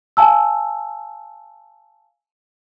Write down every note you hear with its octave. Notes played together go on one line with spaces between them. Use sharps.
F5 G#5 A5 E6